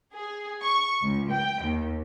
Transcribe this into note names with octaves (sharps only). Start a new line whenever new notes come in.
G#4
C#6
C#2
G5
D#2